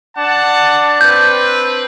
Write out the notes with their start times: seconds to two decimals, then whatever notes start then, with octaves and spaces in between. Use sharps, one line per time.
0.18 D4 F#5 A5
1.01 C4 B4 G6